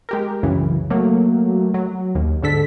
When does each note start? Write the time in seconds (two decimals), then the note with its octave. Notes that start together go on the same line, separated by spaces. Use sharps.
0.09 G#3 G4 A#4
0.43 C2 F#2 C#3 E3
0.90 F#3 A3 A#3
1.74 F#3
2.15 D#2
2.42 G#2 D3 A4 B6